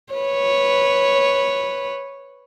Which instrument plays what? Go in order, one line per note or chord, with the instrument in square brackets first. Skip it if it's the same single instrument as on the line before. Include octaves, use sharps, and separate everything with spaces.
[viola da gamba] B4 C#5